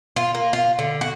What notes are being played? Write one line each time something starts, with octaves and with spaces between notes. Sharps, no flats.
F4
A#3
F4
D3
F#4